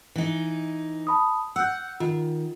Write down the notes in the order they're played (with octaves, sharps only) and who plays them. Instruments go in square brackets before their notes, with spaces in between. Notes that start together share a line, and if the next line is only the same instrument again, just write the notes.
[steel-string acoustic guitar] E3 D#4
[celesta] A5 B5 D#6
[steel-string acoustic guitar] F#5 [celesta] E6 F#6 G6
[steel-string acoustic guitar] D#3 [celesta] F4